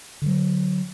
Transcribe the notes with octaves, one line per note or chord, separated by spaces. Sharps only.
D3 F#3